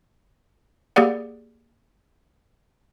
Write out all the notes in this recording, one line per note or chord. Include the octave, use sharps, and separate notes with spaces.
A#3 G4 G#4 D5 F#5